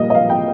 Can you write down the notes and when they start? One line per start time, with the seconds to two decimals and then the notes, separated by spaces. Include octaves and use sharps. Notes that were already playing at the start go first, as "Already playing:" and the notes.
Already playing: A#2 G3 A#3 D#5
0.10 D#5
0.15 F5
0.30 G5